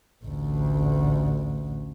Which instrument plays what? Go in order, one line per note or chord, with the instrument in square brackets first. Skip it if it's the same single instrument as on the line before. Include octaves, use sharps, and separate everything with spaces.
[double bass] A1 D2